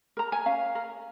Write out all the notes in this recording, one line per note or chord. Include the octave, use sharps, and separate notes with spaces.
A#4 A#5
G#5
C#4 F5
A#4